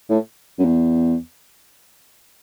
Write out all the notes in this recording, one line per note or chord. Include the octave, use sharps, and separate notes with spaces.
A2
F#2
E2